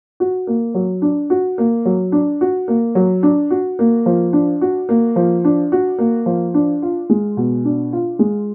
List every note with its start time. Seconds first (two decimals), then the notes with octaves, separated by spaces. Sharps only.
0.20 F#4
0.47 A#3
0.75 F#3
1.02 D4
1.30 F#4
1.58 A#3
1.85 F#3
2.12 D4
2.41 F#4
2.68 A#3
2.95 F#3
3.23 D4
3.51 F#4
3.79 A#3
4.06 F3
4.33 D4
4.61 F#4
4.89 A#3
5.16 F3
5.44 D4
5.72 F#4
5.98 A#3
6.26 F3
6.54 D4
6.82 F4
7.10 G#3
7.37 B2
7.65 D4
7.93 F4
8.19 G#3